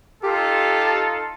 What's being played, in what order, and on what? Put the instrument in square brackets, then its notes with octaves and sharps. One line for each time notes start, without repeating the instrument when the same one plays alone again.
[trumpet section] D#4 F4 A4 [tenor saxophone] G4